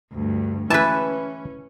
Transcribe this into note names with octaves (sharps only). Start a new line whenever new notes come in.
D2 G2
E3 C#4 E4 B4 G#5 A5